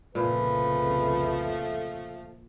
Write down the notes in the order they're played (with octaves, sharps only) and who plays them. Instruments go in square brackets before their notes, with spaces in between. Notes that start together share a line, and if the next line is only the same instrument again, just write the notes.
[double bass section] C2 F2 C#3 [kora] A#2 [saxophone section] F3 A3 [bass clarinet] B4